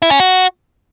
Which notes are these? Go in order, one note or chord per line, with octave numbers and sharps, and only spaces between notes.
E4
C#4
F#4